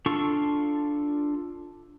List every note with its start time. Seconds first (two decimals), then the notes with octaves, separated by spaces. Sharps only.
0.06 D4 F4 A4 C#6